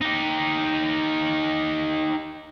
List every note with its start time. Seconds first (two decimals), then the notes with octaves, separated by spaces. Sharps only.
0.01 D#4 G4